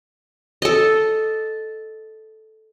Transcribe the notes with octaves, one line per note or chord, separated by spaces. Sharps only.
A4 D#5